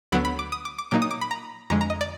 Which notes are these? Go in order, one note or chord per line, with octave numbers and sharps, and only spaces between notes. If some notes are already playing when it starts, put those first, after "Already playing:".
D2 D3 F#3 B3 B5
B5
D6
D#6
D6
D6
A#2 F#3 A#3 D#4 D6
D#6
D6
B5
A#5
F2 D3 G#3 A#5
A#5
D#5
D5